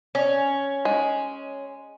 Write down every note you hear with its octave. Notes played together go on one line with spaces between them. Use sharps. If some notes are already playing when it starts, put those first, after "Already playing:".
C#4
G#3